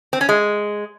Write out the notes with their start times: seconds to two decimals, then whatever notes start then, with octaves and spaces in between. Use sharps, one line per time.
0.13 C4
0.21 C#4
0.29 G#3